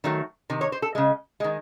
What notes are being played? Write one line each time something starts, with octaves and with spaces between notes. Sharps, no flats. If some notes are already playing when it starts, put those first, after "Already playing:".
D#3 F#3 A3
C3 D#3
C#5
C5
A4
C#3 G#3
D#3 G#3